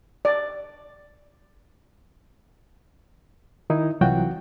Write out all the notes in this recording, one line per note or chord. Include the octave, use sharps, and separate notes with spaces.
D5
D#3 D#4 E4
C2 E3 F#3 F4 F#4 G5